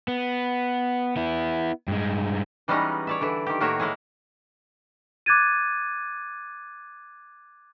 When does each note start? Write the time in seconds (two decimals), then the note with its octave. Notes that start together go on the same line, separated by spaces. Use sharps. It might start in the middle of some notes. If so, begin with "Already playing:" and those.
0.08 B3
1.16 B3 E4
1.88 G2 G#3
2.68 E3 G3 G#3 B3 C#4 D#4
3.07 C#5 D5 E5
3.21 D3 E3 E4
3.47 D#3 G4
3.60 A2 D#3 A#3 F#4 C#5 E5
3.80 G#3 A#3 E4 G#4
5.26 D6 F#6 G#6 A6 D#7